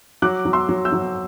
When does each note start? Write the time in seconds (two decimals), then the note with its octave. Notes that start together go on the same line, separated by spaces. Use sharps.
0.22 F#3 D6 F#6
0.45 F#3
0.53 C6 E6
0.69 F#3
0.85 E6 G6
0.92 F#3